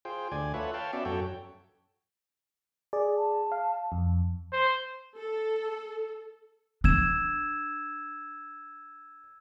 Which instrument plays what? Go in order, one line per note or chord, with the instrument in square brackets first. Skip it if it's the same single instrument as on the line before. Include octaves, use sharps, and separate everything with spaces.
[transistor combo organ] F4 G#4 C5 G5
D2 D5 G#5
F4 A4 B4 C#5 E5 F#5
C#5 F5 G5 A5
B3 C#4 F#4 D5 E5
F#2 F#4 A4 C#5 G5
[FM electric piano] G#4 D5
[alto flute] A5
[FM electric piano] F5
F2
[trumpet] C5
[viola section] A4
[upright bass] D4 [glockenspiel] E6 G#6 E7